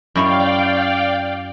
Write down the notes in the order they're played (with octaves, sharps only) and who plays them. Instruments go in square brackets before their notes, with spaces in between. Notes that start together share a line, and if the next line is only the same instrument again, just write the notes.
[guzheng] F#2 E4 C#5 [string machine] D5 F5 G5